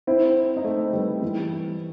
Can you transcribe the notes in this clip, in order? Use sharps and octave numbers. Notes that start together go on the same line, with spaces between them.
C4 E4
D#4
A3 C4
G3 B3
E3 G3